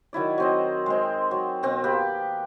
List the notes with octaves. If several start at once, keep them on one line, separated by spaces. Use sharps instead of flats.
D#3 F#3 E4 D5
F#3 C4 D#5
G#3 C4
F#3
B2 C4
A#3 G4 B4